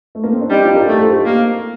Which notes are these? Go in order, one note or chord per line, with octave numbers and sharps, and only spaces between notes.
A3
A#3
C4
D4
G3 C4 D#4
D4 F4
G4 A#4
A3 F4 A4
A4 C5
D#4 G4
A#3